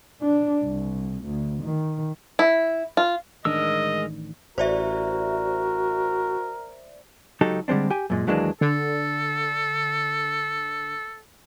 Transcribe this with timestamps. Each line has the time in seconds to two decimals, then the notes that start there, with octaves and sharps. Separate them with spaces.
0.21 D4
0.63 C2
1.25 D2
1.64 D#3
2.39 E4
2.97 F4
3.45 A1 D#3 G#3 D4 A#4 D#5 E6
4.58 A1 F#4 A#4 C5 D5 E5
7.41 C#2 F#3 D#4 G4 A4
7.68 D3 G3 G#3 C4 D4
7.90 G4 G5 G#5
8.10 F#2 A#2 G#3
8.27 D#2 E3 F#3 G#3 A#3 D4
8.61 D3 A4